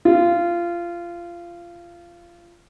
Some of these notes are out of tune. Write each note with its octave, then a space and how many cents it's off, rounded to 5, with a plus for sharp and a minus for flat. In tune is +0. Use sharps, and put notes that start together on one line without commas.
F4 -20